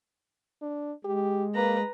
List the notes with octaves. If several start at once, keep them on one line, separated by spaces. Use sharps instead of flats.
D4
G#3 G4
A#3 B4 A#5